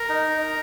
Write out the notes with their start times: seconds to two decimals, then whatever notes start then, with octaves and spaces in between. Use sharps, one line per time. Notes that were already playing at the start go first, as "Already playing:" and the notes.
Already playing: A#4 A#5
0.09 D#4